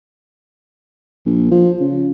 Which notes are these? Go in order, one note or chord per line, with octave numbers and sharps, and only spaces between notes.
A#1
F3
C#3